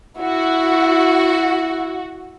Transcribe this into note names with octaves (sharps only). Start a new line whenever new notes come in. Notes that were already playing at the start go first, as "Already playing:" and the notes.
E4 F#4